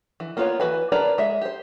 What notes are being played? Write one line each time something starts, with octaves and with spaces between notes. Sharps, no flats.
E3
A#3 B3 F4 B4 C#5
E3 F#4 B4 G#5
A#4 B4 D5 A5 A#5
G#3 E5
G4 C5